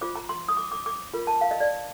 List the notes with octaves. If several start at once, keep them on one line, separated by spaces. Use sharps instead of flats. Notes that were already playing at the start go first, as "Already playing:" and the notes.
F4 C5 D6
A#5
C6
D#6
D6
D6
D6
F4 A#4
A5
F5
D#5
D5